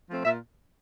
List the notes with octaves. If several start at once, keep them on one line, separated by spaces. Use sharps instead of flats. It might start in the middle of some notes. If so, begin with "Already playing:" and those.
F3 A3 C4
A#2 E5